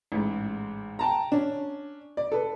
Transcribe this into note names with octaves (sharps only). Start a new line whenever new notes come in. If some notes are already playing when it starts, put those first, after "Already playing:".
A1 G#2
G5 A5 A#5
C#4 D4
D5
A4 B4